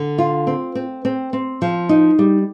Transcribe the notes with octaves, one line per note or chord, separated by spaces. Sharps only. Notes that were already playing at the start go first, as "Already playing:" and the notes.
Already playing: D3
F4
C4
C4
C4
C4
F3
D#4
G3